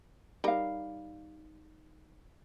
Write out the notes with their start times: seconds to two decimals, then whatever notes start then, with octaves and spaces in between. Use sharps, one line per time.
0.44 G3 D#4 A#4 F5